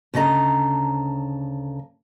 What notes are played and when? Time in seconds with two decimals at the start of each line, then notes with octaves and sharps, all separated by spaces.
0.14 D2 C#3 A4 D#5 A#5